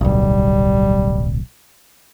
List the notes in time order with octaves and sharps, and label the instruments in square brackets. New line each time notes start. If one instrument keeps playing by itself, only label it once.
[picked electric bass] D1 B1 [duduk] G3